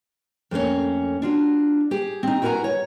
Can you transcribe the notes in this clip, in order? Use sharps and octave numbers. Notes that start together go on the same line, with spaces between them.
F2 A3 A#3 C#4
D4 F4 F#4
G4 G#4
C4 D#4
E4 F#4 A#4 F#5 G#5 A#5
C#5